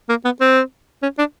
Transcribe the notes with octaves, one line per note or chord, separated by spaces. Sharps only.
A#3
B3
C4
C#4
D4